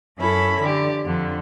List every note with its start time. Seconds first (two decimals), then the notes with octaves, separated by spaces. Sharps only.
0.18 F#2 C#4 E4 A4 B5
0.61 D3 G4
1.04 F2 D3